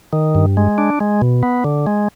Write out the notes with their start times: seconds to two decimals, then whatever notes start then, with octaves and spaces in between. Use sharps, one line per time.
0.13 D#3
0.35 G2
0.57 G#3
0.78 D4
1.00 G#3
1.22 B2
1.43 B3
1.64 D3
1.87 G#3